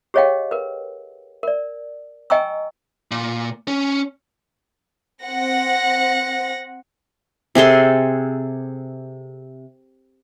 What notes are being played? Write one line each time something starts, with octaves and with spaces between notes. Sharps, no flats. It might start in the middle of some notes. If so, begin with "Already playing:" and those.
G4 G#4 C#5 D#5 F5 G5
A#4 B4
A#4 D5
D#5 G5 G#5 A#5 C#6 E6
A#2
C#4
C4 F#5 A#6
C3 G#4 A4 C6